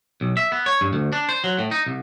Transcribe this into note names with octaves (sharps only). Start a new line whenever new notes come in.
B1
E5
B3
C#5
G2
D2
D4
C5
F#3
A2
D#4
C2